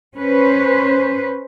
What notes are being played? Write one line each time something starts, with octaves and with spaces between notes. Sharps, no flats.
C#4 B4 C5